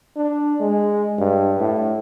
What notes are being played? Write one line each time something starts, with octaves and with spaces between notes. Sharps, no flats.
D4
G#3
G2
A2